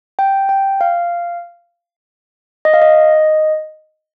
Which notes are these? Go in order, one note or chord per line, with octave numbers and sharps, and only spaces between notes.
G5
G5
F5
D#5
F5
D#5